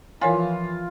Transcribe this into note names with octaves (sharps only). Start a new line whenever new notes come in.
E3 F3 F4 A#4 C#5 G#5